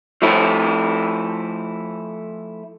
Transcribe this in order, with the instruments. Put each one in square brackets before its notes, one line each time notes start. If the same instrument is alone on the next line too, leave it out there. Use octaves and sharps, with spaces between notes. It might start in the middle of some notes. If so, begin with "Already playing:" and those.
[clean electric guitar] F3 A3 E4